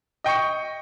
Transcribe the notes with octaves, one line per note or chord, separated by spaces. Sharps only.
D#5 G5 C#6 C#7